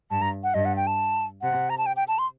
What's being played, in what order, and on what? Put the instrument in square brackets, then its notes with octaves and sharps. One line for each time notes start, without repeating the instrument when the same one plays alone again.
[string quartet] G2 [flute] A5
[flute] A#5
F#5
[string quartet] G2 [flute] D#5
[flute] F#5
G5
A5
[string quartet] C3 [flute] F#5
[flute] A#5
A5
G5
G5
A5
C6